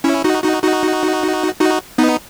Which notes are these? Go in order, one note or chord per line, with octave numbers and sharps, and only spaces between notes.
C#4 E4
D#4 F#4
D#4 F#4
D#4 F#4
D#4 F#4
B3 D#4